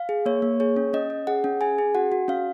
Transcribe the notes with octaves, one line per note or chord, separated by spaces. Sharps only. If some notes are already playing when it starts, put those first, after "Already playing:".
Already playing: F5
G#4
A#3 C#5
A#3
G#4 C#5
C#4
C#4 D#5
C#4
G#4 F#5
C#4
G#4 G#5
G#4
F#4 F#5
F#4
C#4 F5